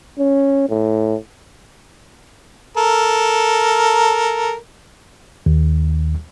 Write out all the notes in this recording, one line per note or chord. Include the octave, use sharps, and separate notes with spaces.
C#4
A2
A4 A#4
D#2